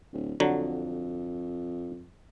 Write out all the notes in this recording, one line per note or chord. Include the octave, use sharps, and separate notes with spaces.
D1
F2 D3 F#3